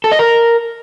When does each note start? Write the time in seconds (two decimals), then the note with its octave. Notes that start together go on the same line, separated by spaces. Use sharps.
0.04 A4
0.12 D#5
0.19 A#4